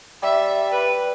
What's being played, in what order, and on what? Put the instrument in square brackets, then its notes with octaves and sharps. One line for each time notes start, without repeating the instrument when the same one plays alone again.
[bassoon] G3 [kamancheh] E5
[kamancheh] B4